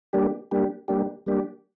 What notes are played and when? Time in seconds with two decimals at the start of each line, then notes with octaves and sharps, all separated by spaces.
0.13 G3 A#3 D4 G4
0.51 G3 A#3 D4 G4
0.88 G3 A#3 D4 G4
1.26 G3 A#3 D4 G4